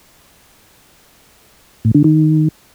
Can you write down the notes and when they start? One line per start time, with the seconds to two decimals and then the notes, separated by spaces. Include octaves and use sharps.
1.85 A2
1.95 D3
2.04 D#3